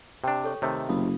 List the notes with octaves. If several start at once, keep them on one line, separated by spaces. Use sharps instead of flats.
C3 D4 G4 G5
A4 C#5 C#6
C3 D#3 A3 C#5
F#1 F5 B5 D#6